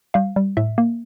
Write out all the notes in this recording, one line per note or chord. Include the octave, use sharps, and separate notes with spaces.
G3 F5
G3
A2 E5
A#3